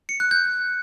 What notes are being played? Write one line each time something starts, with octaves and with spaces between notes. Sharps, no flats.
C#7
F#6
G6